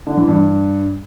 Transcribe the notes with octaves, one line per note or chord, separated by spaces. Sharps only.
D3
E3
G2